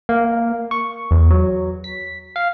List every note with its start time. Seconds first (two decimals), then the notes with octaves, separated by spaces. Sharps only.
0.09 A#3
0.71 C#6
1.11 E2
1.30 F#3
1.84 B6
2.36 F5